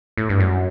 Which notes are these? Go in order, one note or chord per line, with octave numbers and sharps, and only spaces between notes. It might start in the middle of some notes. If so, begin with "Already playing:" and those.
A2
G2
F#2